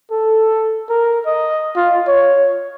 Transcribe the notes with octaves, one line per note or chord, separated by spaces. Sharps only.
A4
A#4
D#5
F4
C#5